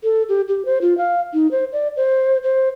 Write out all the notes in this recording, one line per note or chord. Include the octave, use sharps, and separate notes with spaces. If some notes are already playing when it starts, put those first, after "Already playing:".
A4
G4
G4
C5
F4
F5
D#4
C5
D5
C5
C5